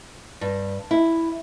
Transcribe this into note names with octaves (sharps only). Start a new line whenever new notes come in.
G2
E4